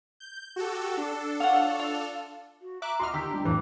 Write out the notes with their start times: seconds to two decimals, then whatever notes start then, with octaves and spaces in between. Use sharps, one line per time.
0.20 G6
0.56 F#4 G4 A4
0.97 D4 A4
1.40 F4 C#5 F#5
1.79 F4
2.61 F#4
2.82 E5 A#5 D6 F#6
3.00 F#4 D#5 C6 D6 F6
3.14 D#3 G4 A#5 E6 B6
3.30 G3 D4
3.45 F2 A2 E3 D6